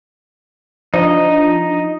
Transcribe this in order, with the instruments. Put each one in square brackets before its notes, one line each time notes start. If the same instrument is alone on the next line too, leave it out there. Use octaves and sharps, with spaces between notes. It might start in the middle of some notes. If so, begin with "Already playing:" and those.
[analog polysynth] F3 D4 [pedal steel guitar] D#4 D#5